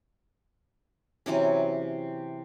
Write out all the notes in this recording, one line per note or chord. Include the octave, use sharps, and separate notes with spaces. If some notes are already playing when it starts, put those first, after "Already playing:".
C3 E3 F#3 C#4